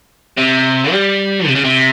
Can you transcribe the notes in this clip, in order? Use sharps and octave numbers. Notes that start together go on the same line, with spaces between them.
C3
G3
C3
C#3
C3